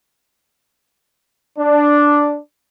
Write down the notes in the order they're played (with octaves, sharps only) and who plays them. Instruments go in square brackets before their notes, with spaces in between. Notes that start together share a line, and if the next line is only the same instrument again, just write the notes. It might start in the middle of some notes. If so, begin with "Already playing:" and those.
[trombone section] D4